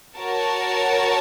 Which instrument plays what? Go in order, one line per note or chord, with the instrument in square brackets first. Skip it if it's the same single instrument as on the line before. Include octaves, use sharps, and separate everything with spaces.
[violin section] F#4 A#4 C#5 A5